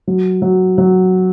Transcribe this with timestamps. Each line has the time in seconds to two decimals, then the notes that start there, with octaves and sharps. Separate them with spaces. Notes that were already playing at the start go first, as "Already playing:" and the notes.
0.07 F#3
0.42 F#3
0.78 F#3